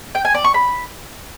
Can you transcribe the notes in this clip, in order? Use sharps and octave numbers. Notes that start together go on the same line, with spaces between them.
G5
G#5
D5
C#6
B5